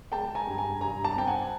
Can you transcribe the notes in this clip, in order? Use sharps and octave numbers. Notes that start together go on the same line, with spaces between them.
G#3 G5 A5
G#5 A#5
G2
G#5 A#5
G2 G#5 A#5
A5
A#5
C4 G5 A5
F#5 G#5